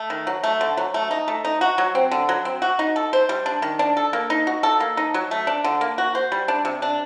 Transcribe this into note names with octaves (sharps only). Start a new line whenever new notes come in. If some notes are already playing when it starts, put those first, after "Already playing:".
Already playing: A3
D#3
F#3
A3
D3
F#3
A3
D#4
A3
D#4
F#4
F#3
C4
D3
F#3
C4
F#4
D#4
A4
C5
G3
D4
D#3
D4
A4
A#3
D#4
F#4
A4
A#3
D#4
F#3
A3
D4
D3
A#3
F#4
C5
G3
D4
C3
D4